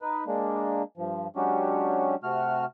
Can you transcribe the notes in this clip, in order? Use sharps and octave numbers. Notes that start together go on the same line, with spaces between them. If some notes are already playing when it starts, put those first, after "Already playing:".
D#4 B4
G#3 A#3 D4
G2 F3
F#3 G#3 C#4 D4 F#4 G4
C3 A3 F#4 F6